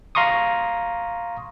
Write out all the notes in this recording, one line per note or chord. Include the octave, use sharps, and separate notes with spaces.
F5 A#5 C6 C#6 D#6